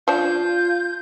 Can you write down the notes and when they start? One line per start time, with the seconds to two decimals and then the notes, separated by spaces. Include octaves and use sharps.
0.08 F3 D4 F4 G6